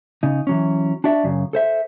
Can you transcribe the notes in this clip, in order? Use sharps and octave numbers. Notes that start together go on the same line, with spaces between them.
C#3 D#4
E3 F#3 C#4
D4 F#4 D5 E5
F#2 C#3
A4 C5 E5